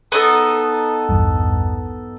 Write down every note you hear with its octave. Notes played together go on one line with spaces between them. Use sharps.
B3 D#4 A4
A#1 E2 G2